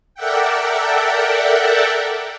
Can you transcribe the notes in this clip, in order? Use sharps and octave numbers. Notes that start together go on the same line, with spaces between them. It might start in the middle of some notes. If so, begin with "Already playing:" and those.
A4 A#4 D5 E5 F#5 G5